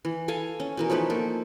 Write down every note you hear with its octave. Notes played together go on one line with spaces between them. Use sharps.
E3
A4 F5 G#5
C#4
B2 E3 A#4
F3 A3 D#4 B4
A#3 A4